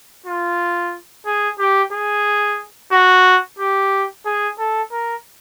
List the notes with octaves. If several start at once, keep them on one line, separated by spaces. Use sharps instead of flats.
F4
G#4
G4
G#4
F#4
G4
G#4
A4
A#4